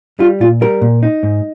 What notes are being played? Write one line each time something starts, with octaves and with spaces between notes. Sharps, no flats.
G3 F4
A#2 F4
G3 A#4
A#2
D#4
G#2